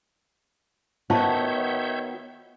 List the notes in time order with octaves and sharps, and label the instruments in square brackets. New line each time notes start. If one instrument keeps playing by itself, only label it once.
[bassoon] D#3 [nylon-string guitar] B3 F#4 [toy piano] C5 A5 [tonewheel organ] C#5 E5 G6